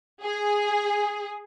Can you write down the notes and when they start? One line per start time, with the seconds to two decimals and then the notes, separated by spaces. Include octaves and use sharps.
0.23 G#4